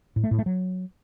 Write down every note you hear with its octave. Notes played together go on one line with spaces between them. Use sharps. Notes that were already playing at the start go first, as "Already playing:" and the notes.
A2
A3
A2
A3
F#3